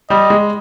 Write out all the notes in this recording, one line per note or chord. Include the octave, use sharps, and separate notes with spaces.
G3 D#5
G#3